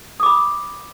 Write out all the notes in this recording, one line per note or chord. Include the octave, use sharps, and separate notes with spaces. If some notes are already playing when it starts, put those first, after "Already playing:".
B5 D6 D#6